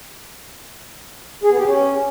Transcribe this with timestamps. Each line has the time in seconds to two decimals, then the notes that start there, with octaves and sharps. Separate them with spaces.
1.44 G#4
1.51 B3
1.59 G4
1.66 C#4